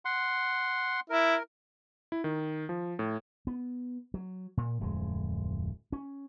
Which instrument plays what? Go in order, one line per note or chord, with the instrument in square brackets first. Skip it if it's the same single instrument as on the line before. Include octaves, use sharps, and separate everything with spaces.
[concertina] F#5 C6
[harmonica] E4 [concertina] A#4
[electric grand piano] E4
D#3
F3
A2
[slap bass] B3
F#3
A#2
D1 F2 G#3
C#4